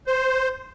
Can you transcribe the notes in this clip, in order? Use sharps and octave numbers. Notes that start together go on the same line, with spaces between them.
C5